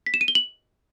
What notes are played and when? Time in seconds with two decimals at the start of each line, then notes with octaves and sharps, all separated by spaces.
0.07 B6
0.14 E7
0.21 D#7
0.28 G7
0.35 F#7